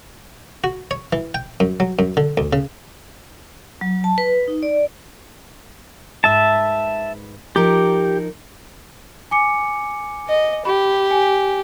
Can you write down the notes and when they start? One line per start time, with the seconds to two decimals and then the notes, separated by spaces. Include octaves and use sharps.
0.64 F#4
0.91 C#5
1.13 E3
1.34 G5
1.60 F#2
1.80 F#3
1.99 F#2
2.17 D3
2.37 D2
2.53 C#3
3.81 F#3
4.04 A5
4.18 B4
4.48 D#4
4.63 D5
6.24 G#2 B4 E5 A5
7.56 F3 D#4 G4 A#4
9.31 G#5 D6 C#7
10.28 D#5
10.65 G4 B5
11.11 G#5